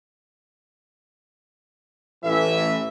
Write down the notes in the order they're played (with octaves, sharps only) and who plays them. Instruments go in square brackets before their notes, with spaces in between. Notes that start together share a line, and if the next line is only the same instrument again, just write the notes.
[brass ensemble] A1 E3 E5